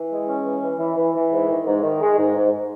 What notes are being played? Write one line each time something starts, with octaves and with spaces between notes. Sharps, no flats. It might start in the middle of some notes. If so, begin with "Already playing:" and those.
Already playing: E3
G#3
C#4
E3
E3
E3
E3
E3
G#2
D#3
G#2
D#3
G#3
G#2
G#2